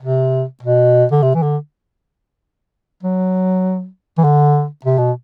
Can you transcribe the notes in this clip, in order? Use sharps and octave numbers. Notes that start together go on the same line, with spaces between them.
C3
B2
D3
C3
E3
D3
F#3
E3
D3
C3
B2